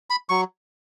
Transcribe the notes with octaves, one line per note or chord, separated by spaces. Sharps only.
B5
F#3 C#6